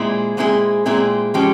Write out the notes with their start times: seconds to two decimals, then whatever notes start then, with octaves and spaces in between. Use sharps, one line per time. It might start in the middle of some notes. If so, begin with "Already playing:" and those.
Already playing: A#2 G#3 C4 E4 G#4
0.37 A#2 G#3 C4 E4 G#4
0.86 A#2 G#3 C4 E4 G#4
1.34 F3 G#3 C#4 G4